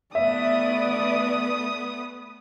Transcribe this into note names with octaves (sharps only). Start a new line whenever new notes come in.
A3 B3 B4 D5 E5 D#6